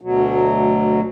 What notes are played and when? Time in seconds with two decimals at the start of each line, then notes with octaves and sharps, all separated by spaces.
0.01 D2 B2 F#3